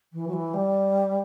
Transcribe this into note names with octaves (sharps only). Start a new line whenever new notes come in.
E3
F#3
E3
G3